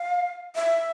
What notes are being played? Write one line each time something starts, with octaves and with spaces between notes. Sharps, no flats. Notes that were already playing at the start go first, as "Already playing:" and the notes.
Already playing: F5
E5